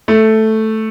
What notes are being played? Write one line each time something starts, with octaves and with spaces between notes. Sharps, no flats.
A3